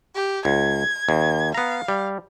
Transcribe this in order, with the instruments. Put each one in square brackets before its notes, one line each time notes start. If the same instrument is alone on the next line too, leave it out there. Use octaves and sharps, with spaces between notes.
[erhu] G4
[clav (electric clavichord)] C#2 [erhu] G#6
[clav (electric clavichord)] D#2
[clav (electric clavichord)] B3 A#5 [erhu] F5
[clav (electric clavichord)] G3